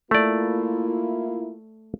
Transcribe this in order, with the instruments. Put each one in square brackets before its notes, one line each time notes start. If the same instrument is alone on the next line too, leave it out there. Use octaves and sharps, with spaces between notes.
[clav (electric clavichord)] A3 D5 [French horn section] A#3 E4 F4